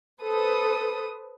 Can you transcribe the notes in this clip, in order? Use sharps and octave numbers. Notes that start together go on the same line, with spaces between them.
A4 B4 C5 D#6